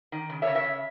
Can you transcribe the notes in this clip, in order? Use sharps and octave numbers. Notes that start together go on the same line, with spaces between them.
D#3
C#3
C#5 E5
C#3
C#5 E5
C#3